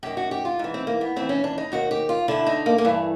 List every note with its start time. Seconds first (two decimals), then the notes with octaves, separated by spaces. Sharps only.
0.03 F#2 D#3 G4
0.17 F#4
0.31 G4
0.45 F4
0.59 G#2 E3
0.74 C4
0.87 A#3
1.01 B3
1.16 D#2 C#3 E3 C4
1.29 C#4
1.44 D4
1.58 D#4
1.72 D#2 D#3 F#4
1.91 G4
2.09 F4
2.28 D2 D3 E4
2.47 D#4
2.66 A#3
2.78 A#3
2.84 G2 E3 A3